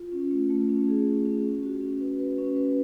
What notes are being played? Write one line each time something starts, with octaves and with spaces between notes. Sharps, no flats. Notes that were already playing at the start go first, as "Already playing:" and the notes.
Already playing: F4
C#4
A3
A3
C#4
G#4
C#4
C#4
C#4
F#4
C#4
B4
B4
C#4
B4